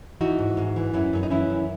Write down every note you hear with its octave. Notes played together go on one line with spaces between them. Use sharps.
E3 D#4 F#4
G#2
G#2
E3
F#2 C#4 E4
F#2 C#4
D#4
E3 C#4 E4
F#2